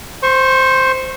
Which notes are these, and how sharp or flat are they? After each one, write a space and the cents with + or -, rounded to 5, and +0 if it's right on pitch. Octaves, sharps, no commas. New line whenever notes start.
C5 +0 C#6 -30